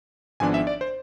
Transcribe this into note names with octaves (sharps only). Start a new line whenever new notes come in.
G#1 G#2 F3 B3 D4 G#5
E5
D5
C5